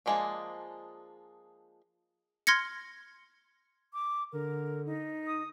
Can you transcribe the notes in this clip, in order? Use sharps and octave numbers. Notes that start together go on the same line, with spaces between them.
F3 F#3 G#3 A#3 D4
C6 F6 G#6 A#6 C#7
D6
D3 A#4
D#4
D#6